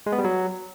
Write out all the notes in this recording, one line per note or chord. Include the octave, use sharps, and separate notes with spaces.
G#3
B3
G3
F#3